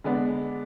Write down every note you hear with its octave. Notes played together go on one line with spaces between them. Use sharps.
D3 G#3 B3 D4